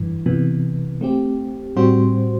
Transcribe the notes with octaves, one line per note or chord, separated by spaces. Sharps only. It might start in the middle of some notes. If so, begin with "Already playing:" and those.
Already playing: G2 E3
C3 E3 B3
A3 C4 G4
A2 G3 C4 F#4 C5